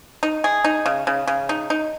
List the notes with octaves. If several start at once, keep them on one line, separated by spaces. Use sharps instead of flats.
D#4
G#4
D#4
C#3
C#3
C#3
D#4
D#4